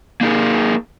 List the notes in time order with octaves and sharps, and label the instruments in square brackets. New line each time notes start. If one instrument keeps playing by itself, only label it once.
[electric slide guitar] A#3 D#4 G#4 A#4